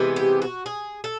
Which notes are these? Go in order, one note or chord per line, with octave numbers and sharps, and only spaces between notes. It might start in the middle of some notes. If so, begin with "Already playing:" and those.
Already playing: C3 E3 G#3 B3
G4
F#4
G#4
A4